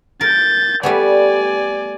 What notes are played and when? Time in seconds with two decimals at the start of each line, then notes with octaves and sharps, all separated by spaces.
0.21 A#4 G6 A6
0.83 G3 A3 B3 D5 G#5